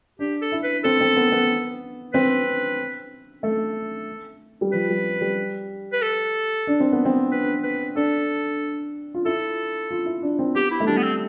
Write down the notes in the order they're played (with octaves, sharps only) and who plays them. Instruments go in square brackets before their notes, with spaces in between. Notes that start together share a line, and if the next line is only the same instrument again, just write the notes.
[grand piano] D4 [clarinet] G4
[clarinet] A4
[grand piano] E4
[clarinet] B4
[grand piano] C4 [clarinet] A4
[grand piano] C4
B3
B3
[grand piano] C4 [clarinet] B4
[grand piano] A3 [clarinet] A4
[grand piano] G3
[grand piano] F3 [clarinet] B4
[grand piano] G3
G3
[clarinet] B4
A4
[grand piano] D4
C4
B3
C4
[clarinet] B4
B4
[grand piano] D4 [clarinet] A4
[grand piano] F4
[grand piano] E4 [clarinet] A4
[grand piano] F4
E4
D4
C4
[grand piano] B3 [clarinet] G4
[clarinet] E4
[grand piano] A3
[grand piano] G3 [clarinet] D4
[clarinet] B3
C4